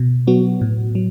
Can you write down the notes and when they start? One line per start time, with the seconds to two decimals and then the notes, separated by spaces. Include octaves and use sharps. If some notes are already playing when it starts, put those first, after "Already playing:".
Already playing: B2
0.27 F#3 B3 F#4
0.61 A2
0.95 F#3